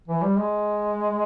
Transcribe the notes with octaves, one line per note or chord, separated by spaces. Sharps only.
E3
G3
G#3